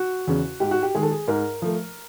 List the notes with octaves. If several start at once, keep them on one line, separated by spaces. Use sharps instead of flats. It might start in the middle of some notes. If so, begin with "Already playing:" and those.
Already playing: F#4
E2 C#3
G#2 G4
F#4
G4
D#3 G#3 G#4
A4
G#4
G#2 A#4
F3 A3